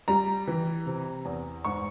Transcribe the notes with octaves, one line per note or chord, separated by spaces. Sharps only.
G3 A#5
E3
C3
E2
G#2 C#6